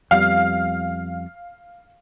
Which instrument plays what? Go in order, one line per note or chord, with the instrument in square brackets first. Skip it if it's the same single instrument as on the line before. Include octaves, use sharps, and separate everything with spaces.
[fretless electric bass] F2 G3 B3 [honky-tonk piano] F5